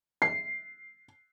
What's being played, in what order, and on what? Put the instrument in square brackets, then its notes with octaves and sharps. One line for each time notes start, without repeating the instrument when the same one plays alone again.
[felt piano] C7